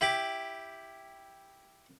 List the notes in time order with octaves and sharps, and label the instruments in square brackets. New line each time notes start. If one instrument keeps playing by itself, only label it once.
[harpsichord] E4 G4 B5 D6